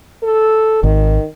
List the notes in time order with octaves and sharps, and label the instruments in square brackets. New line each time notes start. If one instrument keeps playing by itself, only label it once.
[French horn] A4
[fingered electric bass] G#1 [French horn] D#3